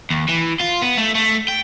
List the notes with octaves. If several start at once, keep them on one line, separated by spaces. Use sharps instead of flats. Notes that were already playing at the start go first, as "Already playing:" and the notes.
D#2
E3
F4
B3
A3
A3
G5